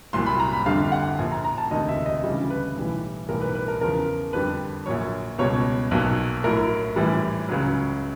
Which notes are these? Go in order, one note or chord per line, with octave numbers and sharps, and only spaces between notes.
C2 A#2 F#3 C6
B5
A#5
B5
G1 F2 D3 G3 F5
F#5
A#1 A#2 F3 G#5
A#5
A#5
A5
E1 D2 C3 D#3 D#5
E5
D#5
D2 C#3 E3 G3
B4
B1 A2 E3 G3
B1 A2 E3 G3 A#4
B4
B4
A#4
E2 C#3 F3 A#4
F2 D3 G3 B4
A#1 A#2 F#3 C#5
C#2 B2 G3 C#5
B1 A#2 F#3
A#1 A2 F#3 A#4
A#1 A2 E3 G3
C#2 C#3 F#3